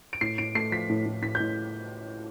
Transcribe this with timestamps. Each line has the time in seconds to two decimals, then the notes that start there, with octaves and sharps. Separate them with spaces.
0.13 D7
0.21 A2 C7
0.38 A2 D7
0.55 A3 C7
0.72 F3 B6
0.89 A2
1.06 A2
1.22 A2 B6
1.35 G6
1.40 A2